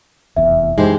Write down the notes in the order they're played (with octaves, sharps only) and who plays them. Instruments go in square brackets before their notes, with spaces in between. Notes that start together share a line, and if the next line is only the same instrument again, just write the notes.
[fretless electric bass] F1 E2 [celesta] E5
[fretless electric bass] F#2 E3 [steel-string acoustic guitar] G#3 G4 C5 [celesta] D#4